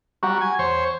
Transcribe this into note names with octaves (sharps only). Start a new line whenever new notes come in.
G3 F#4 F#5 A#5 C#6
G#5
E2 C5 C#5